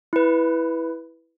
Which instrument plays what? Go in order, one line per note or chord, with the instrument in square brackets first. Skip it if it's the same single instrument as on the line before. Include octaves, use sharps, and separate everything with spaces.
[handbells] E4 B4